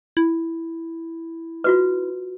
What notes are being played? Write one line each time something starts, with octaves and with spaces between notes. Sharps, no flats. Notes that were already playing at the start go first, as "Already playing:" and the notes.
E4
F4 F#4 B4